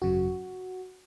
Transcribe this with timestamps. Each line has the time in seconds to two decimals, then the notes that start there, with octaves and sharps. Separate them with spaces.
0.02 G#1 F#2 C#3 F#3 F#4